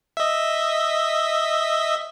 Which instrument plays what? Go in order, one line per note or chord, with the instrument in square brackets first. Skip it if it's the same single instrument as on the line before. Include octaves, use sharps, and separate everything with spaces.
[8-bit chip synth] D#5 E5